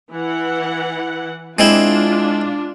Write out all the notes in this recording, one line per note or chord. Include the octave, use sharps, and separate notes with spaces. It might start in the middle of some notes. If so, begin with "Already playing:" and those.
E3 F#5
G#3 C4 D4 E4 F4